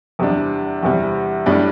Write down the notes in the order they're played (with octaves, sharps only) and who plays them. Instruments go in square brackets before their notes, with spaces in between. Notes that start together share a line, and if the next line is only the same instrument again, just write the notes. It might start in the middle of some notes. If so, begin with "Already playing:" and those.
[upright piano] E2 C3 G3 D4
E2 C3 G3
A2 G3 D4